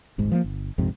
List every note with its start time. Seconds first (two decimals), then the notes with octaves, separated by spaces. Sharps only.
0.18 D#1 G#1 G#2
0.32 F3 G3 A#3
0.44 G1
0.78 A#1 F2 G#2 C3